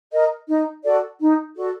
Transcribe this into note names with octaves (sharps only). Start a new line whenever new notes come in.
A#4 D#5
D#4
F#4 A4 D5
D#4
F#4 A4 D5